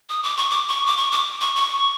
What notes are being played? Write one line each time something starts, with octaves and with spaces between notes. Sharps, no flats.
D#6
D6
C#6
D6
C#6
D6
C#6
D6
C#6
C#6